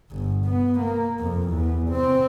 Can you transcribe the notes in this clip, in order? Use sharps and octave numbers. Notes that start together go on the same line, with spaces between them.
G1
B3
A#3
F2
E2
C4